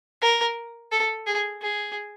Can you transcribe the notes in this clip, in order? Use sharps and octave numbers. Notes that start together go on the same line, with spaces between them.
A#4
A4
G#4
G#4